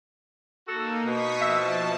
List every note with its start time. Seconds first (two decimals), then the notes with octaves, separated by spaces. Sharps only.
0.68 A#3 D#4 F#4 A4
1.04 B2 C#6 D#6 B6
1.41 F3 E5 A5